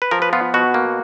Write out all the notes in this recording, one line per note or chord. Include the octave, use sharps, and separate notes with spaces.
B4
F3 A#4
B4
B3 F4
B2 F#4
A#3